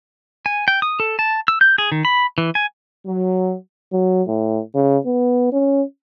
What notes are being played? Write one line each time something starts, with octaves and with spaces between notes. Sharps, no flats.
G#5
G5
D#6
A4
A5
E6
G6
G#4
D#3
B5
E3
G#5
F#3
F#3
A2
C#3
B3
C#4